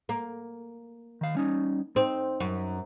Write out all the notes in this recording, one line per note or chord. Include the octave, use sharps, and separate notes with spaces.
A#3
D#3 F5
G3 C#4 D#4
C4 D#4
F#2